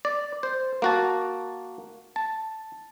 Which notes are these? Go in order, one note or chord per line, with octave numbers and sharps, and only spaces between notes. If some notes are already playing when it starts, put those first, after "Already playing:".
D5
C5
A#3 F#4 A5
A5